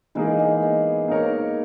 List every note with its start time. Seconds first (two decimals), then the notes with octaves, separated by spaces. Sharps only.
0.15 E3 G#3 A#3 D#4 G#4
0.39 G#3
0.62 B3
1.08 A#3 D#4 A#4 C#5